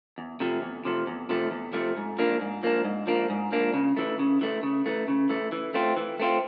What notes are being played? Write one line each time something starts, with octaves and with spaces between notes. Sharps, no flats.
E2
C3 F3 A3
E2
C3 F3 A3
E2
C3 F3 A3
E2
C3 F3 A3
G#2
F3 A#3 D4
G#2
F3 A#3 D4
G#2
F3 A#3 D4
G#2
F3 A#3 D4
C#3
E3 A3
C#3
E3 A3
C#3
E3 A3
C#3
E3 A3
E3
A3 C4 F4
E3
A3 C4 F4